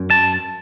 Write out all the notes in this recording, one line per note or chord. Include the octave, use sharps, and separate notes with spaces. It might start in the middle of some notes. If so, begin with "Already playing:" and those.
Already playing: F#2
A5